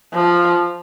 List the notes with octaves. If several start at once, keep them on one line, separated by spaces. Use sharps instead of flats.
F3